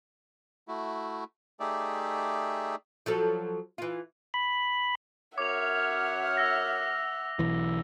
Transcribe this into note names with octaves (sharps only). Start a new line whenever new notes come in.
A3 E4 F#4
A3 D#4 G4 G#4 D5 E5
F3 F#3 A4
E3 F4
B5
F#2 C#5 E5 F#5 D6 F6 F7
E6 A#6
B1 E3